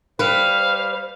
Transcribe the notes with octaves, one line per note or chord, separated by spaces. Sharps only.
G3 B4 C5 F5